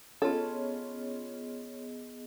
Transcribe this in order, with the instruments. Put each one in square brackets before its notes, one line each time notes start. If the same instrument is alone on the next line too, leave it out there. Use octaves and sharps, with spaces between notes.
[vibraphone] B3 G#4 D#5 [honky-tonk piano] C#4 F4 [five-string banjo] A4